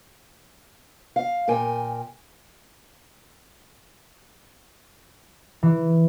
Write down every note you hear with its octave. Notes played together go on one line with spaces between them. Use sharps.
F5
A#2 A#4 G5 G#5
E3